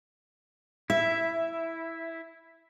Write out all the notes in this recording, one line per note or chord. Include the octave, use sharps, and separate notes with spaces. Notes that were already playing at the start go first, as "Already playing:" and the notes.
E4 E5